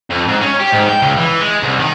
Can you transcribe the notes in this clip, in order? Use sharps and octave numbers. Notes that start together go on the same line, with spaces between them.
F2
G#2
C#4
G4
G#2
G5
C#2
E3
G#3
C2
D#3